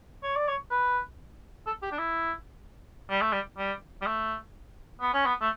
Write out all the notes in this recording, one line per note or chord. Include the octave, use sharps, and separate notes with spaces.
C#5
D5
C#5
B4
A4
G4
D4
E4
G3
A3
G3
G3
G3
A3
B3
C#4
B3
A3